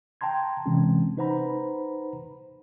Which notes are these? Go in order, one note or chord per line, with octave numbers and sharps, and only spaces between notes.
G5 A5 A#5 C6 G#6
C3 E3 G#3 C4 C#4
D#4 B4 C5 F#5 A#5 B5